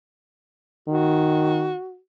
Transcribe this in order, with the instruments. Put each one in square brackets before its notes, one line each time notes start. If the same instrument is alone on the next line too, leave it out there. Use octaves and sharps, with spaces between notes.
[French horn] D#3 [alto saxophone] F#4